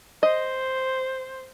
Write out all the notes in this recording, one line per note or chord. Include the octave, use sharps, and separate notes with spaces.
C5 D#5